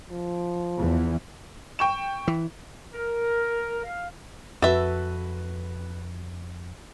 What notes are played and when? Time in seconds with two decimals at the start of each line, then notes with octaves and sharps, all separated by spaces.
0.10 F3
0.80 E2 E3
1.79 G5 C#6 E7
2.28 E3
2.93 A#4
3.84 F5
4.62 F2 F#4 A4 B4 E5